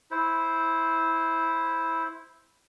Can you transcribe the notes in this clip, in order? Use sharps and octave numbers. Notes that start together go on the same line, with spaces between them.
E4 C5